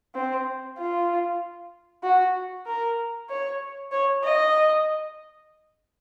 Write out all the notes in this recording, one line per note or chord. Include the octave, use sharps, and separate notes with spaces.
C4
F4
F#4
A#4
C#5
C#5
D#5